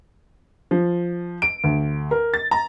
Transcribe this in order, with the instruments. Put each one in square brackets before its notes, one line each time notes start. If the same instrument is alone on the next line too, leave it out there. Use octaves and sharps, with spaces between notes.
[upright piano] F3
D7
D2
A#4
A6
A#5